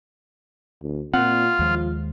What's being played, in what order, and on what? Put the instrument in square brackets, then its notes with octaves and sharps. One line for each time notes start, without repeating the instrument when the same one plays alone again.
[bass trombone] D2
[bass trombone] A#2 [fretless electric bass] C4 [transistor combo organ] F4 [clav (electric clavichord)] F#5
[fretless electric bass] D#2 G#3 [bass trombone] F3